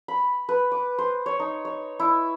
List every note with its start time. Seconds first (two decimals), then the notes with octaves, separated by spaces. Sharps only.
0.08 B5
0.49 B4
0.72 D6
0.99 C5
1.26 C#5
1.40 D#4
1.65 C#5
2.00 E4